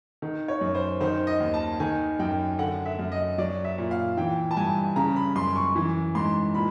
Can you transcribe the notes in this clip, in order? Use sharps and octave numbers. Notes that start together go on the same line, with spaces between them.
D#3
C#5
F#2
C5
D#3 C5
D#5
D#2
A5
D#3 G#5
F#2 G5
D3 F#5
E5
F#2
D#5
F#3 D5
E5
A#2
F5
E3 G5
A5
G2 G#5
C#3 A#5
B5
F#2 C6
C#6
E3
G#2 C6
A#2 B5